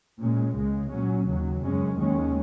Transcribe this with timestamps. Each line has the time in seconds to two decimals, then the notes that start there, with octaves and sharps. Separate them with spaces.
0.20 A#2 G#3 C#4
0.55 C#2 C#3 G#3
0.92 A#2 F#3 C#4
1.27 D#2 C#3 F#3
1.63 F#2 C#3 G#3 C#4
1.99 D#2 D#3 G#3 C#4